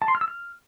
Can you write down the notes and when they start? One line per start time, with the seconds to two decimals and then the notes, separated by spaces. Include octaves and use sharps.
0.02 A5
0.08 C6
0.15 F6
0.21 E6
0.28 F6